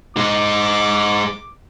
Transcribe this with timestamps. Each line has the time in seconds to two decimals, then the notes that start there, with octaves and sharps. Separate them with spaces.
0.17 G#3 D#4 D6